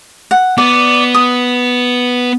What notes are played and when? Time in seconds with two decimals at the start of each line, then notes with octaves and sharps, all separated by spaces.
0.31 F#5
0.58 B3 D5
1.14 D#6